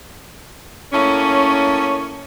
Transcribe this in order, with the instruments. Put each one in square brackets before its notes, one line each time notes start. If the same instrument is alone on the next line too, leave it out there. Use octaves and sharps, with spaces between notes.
[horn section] A2 A#3 C#4